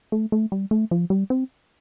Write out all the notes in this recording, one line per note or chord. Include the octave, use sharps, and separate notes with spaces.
A3
A3
G3
A3
F3
G3
C4